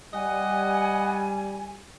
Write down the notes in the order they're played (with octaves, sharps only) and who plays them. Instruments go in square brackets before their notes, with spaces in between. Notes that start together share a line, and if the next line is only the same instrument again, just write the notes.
[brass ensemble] G3 [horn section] D#5 F#5 [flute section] G#5